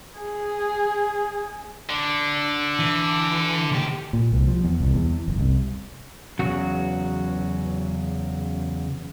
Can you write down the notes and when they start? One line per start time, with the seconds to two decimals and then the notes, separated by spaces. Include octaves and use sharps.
0.19 G#4
1.89 D3
2.79 E3
3.72 D2 G4
4.13 A#2
4.32 C2
4.47 F3
4.63 E2
4.80 C2
4.94 E2
5.28 F#1
5.39 C2
6.39 E2 C#3 F#3 F#4